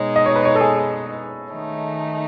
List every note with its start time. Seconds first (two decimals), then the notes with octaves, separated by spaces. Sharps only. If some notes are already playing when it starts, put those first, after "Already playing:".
Already playing: B2 G#3 D#4 C#5
0.16 D#5
0.26 C#5
0.36 B4
0.45 C#5
0.55 A4
0.61 G#4
1.51 D#3 A3 D#4